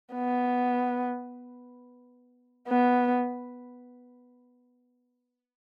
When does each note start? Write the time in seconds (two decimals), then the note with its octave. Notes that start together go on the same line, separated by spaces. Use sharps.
0.15 B3
2.68 B3